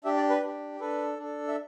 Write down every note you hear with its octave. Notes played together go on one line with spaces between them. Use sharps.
D4 G4 E5
D5
B4
D4 G4
D4 A4 B4
D4 A4
E5